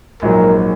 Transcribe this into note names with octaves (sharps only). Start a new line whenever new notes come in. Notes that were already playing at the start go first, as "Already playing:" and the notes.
A#1 G#2 F#3 A#4